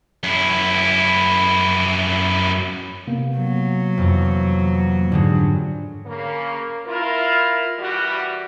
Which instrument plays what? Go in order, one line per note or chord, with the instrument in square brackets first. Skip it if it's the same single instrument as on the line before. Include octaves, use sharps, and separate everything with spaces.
[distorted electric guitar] F#2 E4
[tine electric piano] C3 A#3 B3
[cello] F#3
[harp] F2 E3
[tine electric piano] G#2 [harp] D3 G3 G#3
[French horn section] C#3 A#3
E4 F4 A#4
E3 G3 F#4